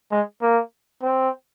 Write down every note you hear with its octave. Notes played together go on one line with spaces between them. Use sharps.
G#3
A#3
C4